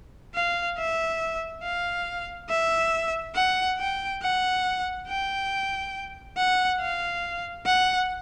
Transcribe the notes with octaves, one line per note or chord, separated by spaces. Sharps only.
F5
E5
F5
E5
F#5
G5
F#5
G5
F#5
F5
F#5